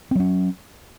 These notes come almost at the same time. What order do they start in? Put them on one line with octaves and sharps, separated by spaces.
C4 F#3 C#4